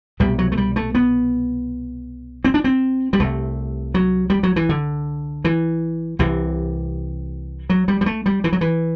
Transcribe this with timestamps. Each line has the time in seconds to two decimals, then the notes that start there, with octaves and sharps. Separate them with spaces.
0.20 C2 B2 G3
0.39 F#3
0.52 A3
0.57 G3
0.76 A3
0.95 B3
2.45 C4
2.54 D4
2.64 C4
3.13 G3
3.20 C2 C3 A3
3.94 F#3
4.30 G3
4.43 F#3
4.56 E3
4.69 D3
5.45 E3
6.19 C2 C3 E3
7.70 F#3
7.88 G3
8.01 G3
8.06 A3
8.26 G3
8.44 E3
8.53 F#3
8.61 E3